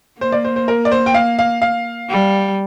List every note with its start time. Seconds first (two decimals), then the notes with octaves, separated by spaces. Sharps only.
0.21 A#3 C5
0.32 D5
0.45 C5
0.56 C5
0.68 A#4
0.85 D5
0.92 C5
1.06 G5
1.14 F5
1.39 F5
1.62 F5
2.09 G3